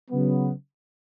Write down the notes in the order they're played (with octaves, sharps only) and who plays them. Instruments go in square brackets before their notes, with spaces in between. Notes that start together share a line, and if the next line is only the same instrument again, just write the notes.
[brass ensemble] C#3 F#3 B3